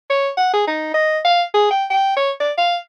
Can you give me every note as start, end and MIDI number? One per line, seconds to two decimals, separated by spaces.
0.10 0.29 73
0.37 0.51 78
0.53 0.64 68
0.67 0.92 63
0.94 1.18 75
1.24 1.42 77
1.54 1.69 68
1.70 1.85 79
1.90 2.14 79
2.16 2.31 73
2.40 2.52 74
2.57 2.76 77